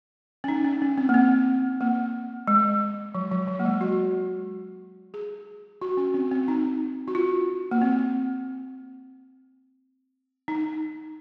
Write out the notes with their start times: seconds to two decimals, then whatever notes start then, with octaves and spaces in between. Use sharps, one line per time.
0.44 C#4
0.48 D#4
0.64 C#4
0.82 C#4
0.98 C4
1.09 A#3
1.14 C4
1.81 A#3
2.48 G#3
3.15 F#3
3.32 F#3
3.48 F#3
3.59 A#3
3.65 G#3
3.81 F#4
5.14 G#4
5.82 F#4
5.97 C#4
6.14 C4
6.32 C4
6.48 D#4
7.08 F#4
7.15 F4
7.71 A#3
7.82 C4
10.48 D#4